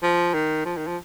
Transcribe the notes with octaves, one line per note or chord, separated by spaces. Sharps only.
F3
D#3
F3
D#3
F3